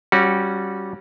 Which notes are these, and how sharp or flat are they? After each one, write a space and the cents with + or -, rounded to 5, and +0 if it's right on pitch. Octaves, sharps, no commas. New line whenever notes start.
G3 -10 C#4 -10 F#4 -25